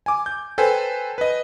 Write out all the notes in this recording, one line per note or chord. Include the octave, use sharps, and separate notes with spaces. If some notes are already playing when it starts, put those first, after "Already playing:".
G#5 D6
G6
A4 B4 C5 G5 G#5
B4 D#5